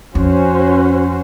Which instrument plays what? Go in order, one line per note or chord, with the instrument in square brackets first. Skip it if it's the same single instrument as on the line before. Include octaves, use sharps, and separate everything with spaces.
[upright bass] F2 [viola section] C#4 F#4 C5